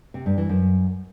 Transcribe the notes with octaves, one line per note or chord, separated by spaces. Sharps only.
C3
G2
E3
F#2